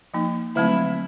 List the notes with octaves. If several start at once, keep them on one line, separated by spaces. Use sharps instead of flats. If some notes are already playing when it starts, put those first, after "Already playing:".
F3 A#3 D#4
D3 F#3 A3 C4 E4